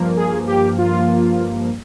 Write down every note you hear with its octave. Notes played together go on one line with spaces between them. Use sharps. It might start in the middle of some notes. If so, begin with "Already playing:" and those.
Already playing: G2 F3 A#3
G#4
G4
F4